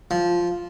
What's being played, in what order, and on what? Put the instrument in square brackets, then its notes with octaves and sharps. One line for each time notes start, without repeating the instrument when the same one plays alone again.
[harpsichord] F3